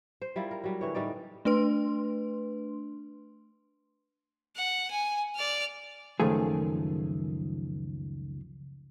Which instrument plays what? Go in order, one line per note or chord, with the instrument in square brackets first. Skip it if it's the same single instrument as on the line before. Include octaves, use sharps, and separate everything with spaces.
[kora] C5
G3 E4 F4 A#4
A#4
F#3 G3
D3 E3 C#5
A2 G3 D#4 D5
[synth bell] A3 D4 B4 C6
[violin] F#5
G#5
D5 F6
[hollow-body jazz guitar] C#2 F#2 D#3 F3 A3 G#4